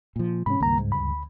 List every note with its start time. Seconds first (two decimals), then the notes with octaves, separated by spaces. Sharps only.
0.16 A#2 F3
0.46 G#2 C3 E3 C#4 B5
0.60 C#2 G2 D#3 A#3 A#5
0.79 G#2
0.92 D2 B5